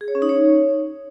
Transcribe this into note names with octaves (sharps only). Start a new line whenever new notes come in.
G#4
C#5
C#4
D#4
C#5